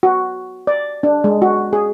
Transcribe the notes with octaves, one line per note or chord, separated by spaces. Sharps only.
F#4
D5
D4
G#3
F#4
G#4